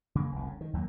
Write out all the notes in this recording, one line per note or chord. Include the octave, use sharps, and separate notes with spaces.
C#3 A#3
F1 C2
C#3
D#3
D#2 F#3 G3 A#3